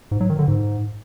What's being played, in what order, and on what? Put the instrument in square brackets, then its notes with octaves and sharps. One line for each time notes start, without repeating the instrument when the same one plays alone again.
[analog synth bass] G#2
F#3
D#3
D3
G#2